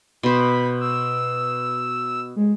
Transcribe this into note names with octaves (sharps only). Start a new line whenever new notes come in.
B2 C5 B5
E6
G#3